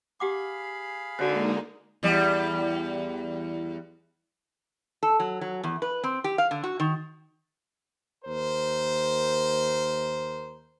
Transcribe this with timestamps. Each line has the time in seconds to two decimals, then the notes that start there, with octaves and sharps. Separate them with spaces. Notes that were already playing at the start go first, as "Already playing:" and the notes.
0.20 G4 G#4 F5 F#5 B5 D6
1.19 D3 G#3 A#3 D#4 F#4 C5
2.03 E2 G3
5.03 A4
5.20 F#3
5.41 F#3
5.64 E2
5.82 B4
6.04 C4
6.24 G4
6.38 F5
6.51 D3
6.64 F#4
6.80 D#3
8.25 D#2 A#4 C5